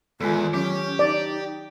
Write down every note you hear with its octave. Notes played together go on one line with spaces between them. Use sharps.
E2 D#3 G#3 F4 A4
F#3 C#4 G4
D#4 D5